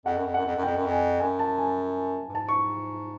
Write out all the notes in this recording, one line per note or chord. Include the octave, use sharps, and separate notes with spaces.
F2 F#5
F#2
F2
F#2 F#5
F2
F#2
F2 G5
F#2
F2
G#5
F#2 G#5
A5
G#5
G2
G#2 A5
C#6